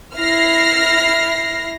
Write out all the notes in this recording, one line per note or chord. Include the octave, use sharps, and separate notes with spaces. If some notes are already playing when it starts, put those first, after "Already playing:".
E4 F6 A#6 C7